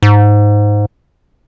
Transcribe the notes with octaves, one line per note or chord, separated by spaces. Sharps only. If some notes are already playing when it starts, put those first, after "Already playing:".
G#2